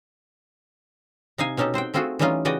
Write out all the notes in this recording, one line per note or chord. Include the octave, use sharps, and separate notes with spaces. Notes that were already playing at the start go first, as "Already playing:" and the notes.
C3 D#4 F5 G#5
B2 C#4 D#4 G4 A4
C4 C5 F#5 G5
A3 C4 F4 F#4 G#4 A4
E3 G3 A3 C#4 D#4 F4
C#3 E3 F#4 D5 D#5 G5